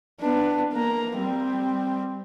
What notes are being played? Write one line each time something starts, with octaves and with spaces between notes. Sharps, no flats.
B3 D4
A#3 A#5
G3 C4